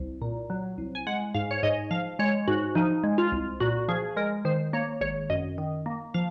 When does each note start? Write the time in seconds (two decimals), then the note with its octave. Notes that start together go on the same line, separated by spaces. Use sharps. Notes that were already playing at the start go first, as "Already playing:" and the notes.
Already playing: C2
0.22 A#2
0.50 F#3
0.78 C2
0.95 G#5
1.07 G#3 F#5
1.34 G#2 F5
1.51 C#5
1.63 G#2 D#5
1.91 F3 F5
2.19 G#3 C#5
2.48 G#2 F#4
2.75 F3 D#4
3.04 G#3
3.18 F4
3.32 C2
3.60 A#2 F#4
3.88 F3 G#4
4.16 G#3 A#4
4.45 D#3 C5
4.73 A#3 C#5
5.01 G#1 C#5
5.30 F#2 D#5
5.58 D#3
5.86 A#3
6.14 F3 F5